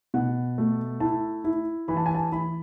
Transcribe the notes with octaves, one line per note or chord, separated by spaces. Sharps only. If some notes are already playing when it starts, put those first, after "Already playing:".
B2 F#5
A3
E4 A5
E4
E3 B5
A5
G#5
A5
E3 B5